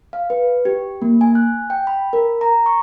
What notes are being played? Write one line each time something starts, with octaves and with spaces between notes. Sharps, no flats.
F5
B4
G4
A#3
G#5
F#6
G5
B5
A#4
A#5
C#6